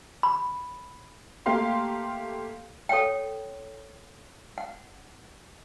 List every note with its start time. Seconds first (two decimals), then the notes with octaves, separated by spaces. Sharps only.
0.23 B5
1.46 A3 A#3 G4 F5 C6
2.89 A4 C#5 F#5 G5
4.58 F#5